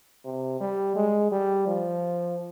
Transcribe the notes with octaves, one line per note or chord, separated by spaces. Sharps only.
C3
G3
G#3
G3
F3